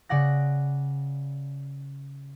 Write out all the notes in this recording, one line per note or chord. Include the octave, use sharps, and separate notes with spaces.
C#3 D5 F#5 A#6